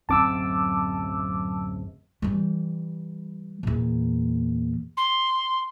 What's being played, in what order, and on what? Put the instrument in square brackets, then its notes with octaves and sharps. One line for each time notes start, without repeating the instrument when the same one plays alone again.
[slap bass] D1 F#2 C4 [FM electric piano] A5 D6 E6
[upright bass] E3 G3
E2 A#2
[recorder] C6